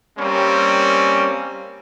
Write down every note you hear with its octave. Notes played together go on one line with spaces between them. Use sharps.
G3 A#3 C4 C#4